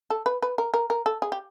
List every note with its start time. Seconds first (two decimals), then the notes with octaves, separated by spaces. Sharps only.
0.10 A4
0.26 B4
0.43 B4
0.58 A#4
0.74 A#4
0.90 A#4
1.06 A4
1.22 G#4
1.32 G4